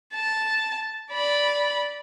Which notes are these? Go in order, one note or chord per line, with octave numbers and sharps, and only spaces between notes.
A5
D5 B5